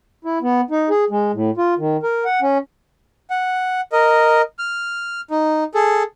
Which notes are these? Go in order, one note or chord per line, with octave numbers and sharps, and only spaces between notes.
E4
B3
D#4
G#4
G#3
A2
F4
D#3
A#4
F#5
C#4
F#5
A#4 D#5
F6
D#4
G#4 A4